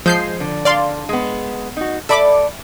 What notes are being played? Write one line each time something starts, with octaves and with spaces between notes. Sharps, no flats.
F3 G#3 G6 C7
D3
D5 F5 C6
G#3 B3
D#4 F#4
A4 D5 E5 B5 D6